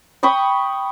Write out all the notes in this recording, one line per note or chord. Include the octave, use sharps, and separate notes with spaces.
G5 B5 C#6 D#6